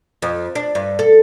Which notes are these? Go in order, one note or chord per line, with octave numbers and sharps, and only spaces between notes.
F2
D4
G2
A4